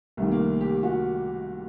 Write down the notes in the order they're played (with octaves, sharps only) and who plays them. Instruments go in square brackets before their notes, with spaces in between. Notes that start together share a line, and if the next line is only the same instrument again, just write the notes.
[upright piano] C2 C3 D#3 A3
A#3
G4
F#4